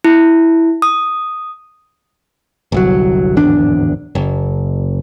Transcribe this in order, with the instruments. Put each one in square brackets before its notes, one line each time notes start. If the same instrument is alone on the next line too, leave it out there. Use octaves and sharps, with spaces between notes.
[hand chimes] E4
D#6
[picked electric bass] G1 C2 F#3
D1 G#1 E2 D4
F#1